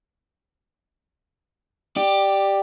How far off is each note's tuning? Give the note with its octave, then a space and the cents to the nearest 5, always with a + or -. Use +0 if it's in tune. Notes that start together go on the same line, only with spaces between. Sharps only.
G4 +0 D5 +15